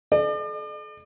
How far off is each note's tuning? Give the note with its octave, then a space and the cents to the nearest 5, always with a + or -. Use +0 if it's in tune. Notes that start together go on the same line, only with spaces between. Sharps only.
A4 -40 D5 +40